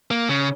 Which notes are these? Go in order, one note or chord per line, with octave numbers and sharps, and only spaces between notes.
A#3
C#3